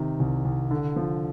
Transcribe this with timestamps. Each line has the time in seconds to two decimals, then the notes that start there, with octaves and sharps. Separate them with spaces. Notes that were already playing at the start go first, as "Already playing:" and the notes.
Already playing: C3 D#3
0.20 C2
0.45 C2
0.71 D3
0.96 F3